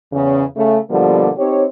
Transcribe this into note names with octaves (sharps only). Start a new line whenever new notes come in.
E2 C#3
C#3 A3
B2 D3 F3 G3 A#3
C4 D#4 G4 C#5